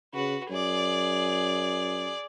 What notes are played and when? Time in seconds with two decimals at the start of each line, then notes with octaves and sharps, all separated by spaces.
0.14 C#3 F#4 B4
0.50 F#2 G#4 D5